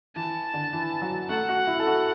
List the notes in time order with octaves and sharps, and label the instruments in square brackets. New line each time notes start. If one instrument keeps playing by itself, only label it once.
[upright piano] E3 [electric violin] A5
[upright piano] D3
E3
F#3
[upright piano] A3 [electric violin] F#5
[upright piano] F#4
E4
A4
F#4